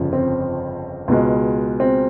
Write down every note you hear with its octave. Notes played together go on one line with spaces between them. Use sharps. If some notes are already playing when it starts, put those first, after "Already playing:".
Already playing: G1 F2 C#3 F3
C4
C#2 B2 G#3
C4